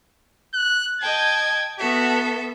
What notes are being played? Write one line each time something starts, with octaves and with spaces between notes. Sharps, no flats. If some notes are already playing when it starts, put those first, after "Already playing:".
F#6
D#5 G5 A5 G#6
B3 F#4 A4 E5